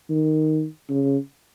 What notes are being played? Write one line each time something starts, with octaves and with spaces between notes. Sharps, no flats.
D#3
C#3